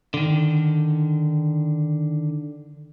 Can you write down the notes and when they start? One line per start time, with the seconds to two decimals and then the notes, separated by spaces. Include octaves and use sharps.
0.14 D3 D#3